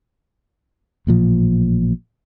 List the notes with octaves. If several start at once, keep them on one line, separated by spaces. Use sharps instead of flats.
A1 A#2 F3